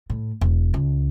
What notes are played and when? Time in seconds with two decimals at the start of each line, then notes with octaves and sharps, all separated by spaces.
0.10 A2
0.41 E1
0.74 C#2